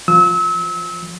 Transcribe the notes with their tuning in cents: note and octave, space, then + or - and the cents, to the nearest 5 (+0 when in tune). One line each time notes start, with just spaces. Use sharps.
F3 +10 E6 -35